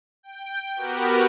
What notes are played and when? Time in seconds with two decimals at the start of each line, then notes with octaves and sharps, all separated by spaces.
0.23 G5
0.76 B3 F#4 G4 A#4 B4